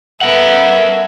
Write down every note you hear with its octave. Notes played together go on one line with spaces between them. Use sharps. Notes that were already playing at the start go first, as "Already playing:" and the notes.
B3 A4 A#4 E5 F#5